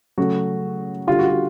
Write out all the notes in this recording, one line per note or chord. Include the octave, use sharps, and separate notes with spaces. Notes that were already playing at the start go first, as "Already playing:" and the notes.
C#3 F#3 A3 F#4
D3 G3 F4
F#4
F#4